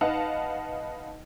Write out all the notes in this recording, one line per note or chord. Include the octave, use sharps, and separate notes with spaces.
D#4 B4 D#5 F5 F#5 A5